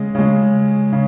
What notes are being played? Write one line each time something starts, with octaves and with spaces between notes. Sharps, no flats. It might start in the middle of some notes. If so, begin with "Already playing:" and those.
Already playing: C#3 G#3
C#3 G#3
C#3